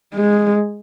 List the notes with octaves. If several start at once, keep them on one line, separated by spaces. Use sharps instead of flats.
G#3